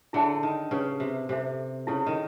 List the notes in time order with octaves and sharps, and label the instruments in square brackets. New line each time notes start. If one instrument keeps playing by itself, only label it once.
[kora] D3 [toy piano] E4 G#4 C#5 E5 A5
[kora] D#3
[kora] C#3 [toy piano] D#4 G4 B4
[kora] C3
[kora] C3 [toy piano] A4 C5 E5
[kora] C#3 [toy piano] E4 A4 C#5
[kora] D#3